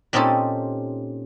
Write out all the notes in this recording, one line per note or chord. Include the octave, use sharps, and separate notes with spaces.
A#2 C4 C#4 D#4 G4 A4